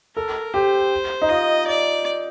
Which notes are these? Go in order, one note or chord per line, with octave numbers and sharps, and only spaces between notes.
A4 A#4
G4 C5
D#4
F4 D#5
D5